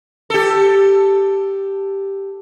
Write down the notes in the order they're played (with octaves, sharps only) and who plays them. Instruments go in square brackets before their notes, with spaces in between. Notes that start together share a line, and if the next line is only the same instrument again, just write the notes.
[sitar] G4 A4